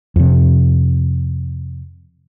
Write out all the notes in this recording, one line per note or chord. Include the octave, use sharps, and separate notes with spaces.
F2 C3